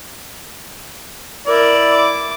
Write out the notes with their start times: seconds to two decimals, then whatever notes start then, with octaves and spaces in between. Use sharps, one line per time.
1.47 E4 A#4 D5
1.93 D6